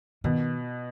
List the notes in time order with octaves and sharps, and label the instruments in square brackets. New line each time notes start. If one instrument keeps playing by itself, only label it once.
[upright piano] B2 [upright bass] D#3